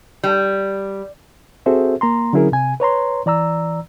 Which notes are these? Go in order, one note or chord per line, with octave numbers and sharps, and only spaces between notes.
G3
C4 F#4 G#4 A4 C5 E5
A#3 A#5 C6
D3 F#3 C#4 E4 G#4 A#4
C3 G#5
B4 C#5 A#5 C6
E3 D5 A#5 E6